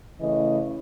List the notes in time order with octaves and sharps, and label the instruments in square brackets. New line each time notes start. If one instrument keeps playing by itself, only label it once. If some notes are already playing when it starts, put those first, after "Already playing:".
[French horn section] C#3 E3 A3 D#5